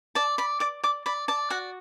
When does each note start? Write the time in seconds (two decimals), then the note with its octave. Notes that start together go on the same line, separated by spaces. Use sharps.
0.15 D5 A5
0.38 D5 B5
0.60 D5 D6
0.84 D5 D6
1.06 D5 B5
1.28 D5 A5
1.50 F#4 F#5